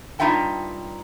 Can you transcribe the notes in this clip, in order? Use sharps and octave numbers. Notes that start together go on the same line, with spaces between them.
G2 D#4 F4 E5 G5 A5